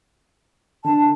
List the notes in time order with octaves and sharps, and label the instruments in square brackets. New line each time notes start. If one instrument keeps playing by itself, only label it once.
[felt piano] D3 [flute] A5